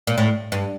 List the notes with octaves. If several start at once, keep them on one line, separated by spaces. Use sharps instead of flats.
A#2
A2
G2